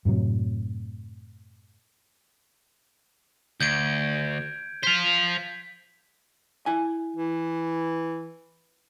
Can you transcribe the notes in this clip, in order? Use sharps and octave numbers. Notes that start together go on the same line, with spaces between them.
F#2 A2 C3 F#3
D2 G6 G#6 D7
C5 F5 B6
E4 G#5
E3